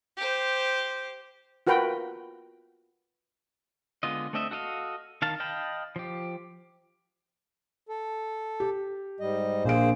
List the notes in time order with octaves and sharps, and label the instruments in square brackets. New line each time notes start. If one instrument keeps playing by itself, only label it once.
[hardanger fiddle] G4 C5
[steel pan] F4 F#4 A#4 B4 G5
[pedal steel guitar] D3 G#3 B3 F4 D#5
A3 C4 D4 D#5 E5
F#4 A4 D#5 F5
D#3 F5 A5
D#5 F5 G5 A5 B5
F3 G4
[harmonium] A4
[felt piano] G4
[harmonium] G#2 G3 D#5
[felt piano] A#1 D7 [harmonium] A#3 G#4 C5